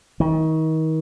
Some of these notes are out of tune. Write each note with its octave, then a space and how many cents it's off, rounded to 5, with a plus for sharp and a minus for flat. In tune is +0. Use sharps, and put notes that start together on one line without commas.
D#3 +35